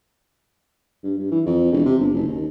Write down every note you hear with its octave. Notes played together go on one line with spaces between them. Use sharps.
G2
G2
E3
F2
E1
C3
G1
F#1
D#2